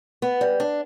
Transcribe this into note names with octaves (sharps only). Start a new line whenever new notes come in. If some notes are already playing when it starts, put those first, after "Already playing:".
B3
G3
D4